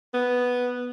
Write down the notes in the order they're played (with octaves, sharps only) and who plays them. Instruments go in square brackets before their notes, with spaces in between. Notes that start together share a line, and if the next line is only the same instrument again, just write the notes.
[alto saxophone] B3